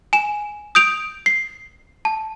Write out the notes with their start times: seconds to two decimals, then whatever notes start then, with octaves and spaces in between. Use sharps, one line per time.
0.13 G#5 E7
0.75 D#6 G6 D7 F7
1.26 C7
2.05 A5